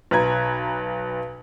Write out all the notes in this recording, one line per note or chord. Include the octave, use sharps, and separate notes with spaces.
B1 B4 A#5 G#6